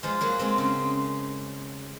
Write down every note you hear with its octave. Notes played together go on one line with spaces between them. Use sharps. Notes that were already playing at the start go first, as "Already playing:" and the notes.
F3 G#3
F#3 A#3
G#3 C4
C#3